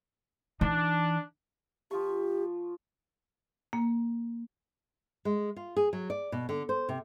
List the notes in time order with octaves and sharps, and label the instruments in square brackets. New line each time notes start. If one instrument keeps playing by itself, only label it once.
[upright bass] E3 D#4 [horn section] D4
[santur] F3 F4 C#6 [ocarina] G4
[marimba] A#3
[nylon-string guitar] G#3
F4
G#4
F#3
D5
B2
D3
C5
C3